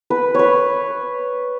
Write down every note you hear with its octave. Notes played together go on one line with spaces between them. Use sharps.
B4
B4 C#5